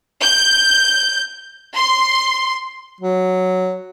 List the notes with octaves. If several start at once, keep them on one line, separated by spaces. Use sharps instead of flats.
G6
C6
F#3